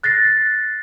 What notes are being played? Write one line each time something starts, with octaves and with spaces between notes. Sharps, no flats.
F#6 A6 A#6 C7